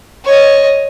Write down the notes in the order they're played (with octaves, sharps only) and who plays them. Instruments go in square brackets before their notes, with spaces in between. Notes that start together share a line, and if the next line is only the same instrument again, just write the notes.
[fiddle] C#5 D#5